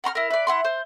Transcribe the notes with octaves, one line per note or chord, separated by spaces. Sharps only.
F#5 A#5 C6 F6
E4 A#4
B4 D5
E4 F#5 C6
C5